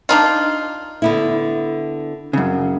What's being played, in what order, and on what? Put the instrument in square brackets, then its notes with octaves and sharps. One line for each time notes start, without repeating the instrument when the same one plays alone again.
[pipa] D4 D#4 F4
[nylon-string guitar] D3 B3 E4
[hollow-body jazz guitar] F#2 C#3